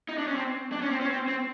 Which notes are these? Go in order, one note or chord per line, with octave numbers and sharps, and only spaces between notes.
D#4
D4
C#4
C4
D4
C#4
C4
C#4
C4
C4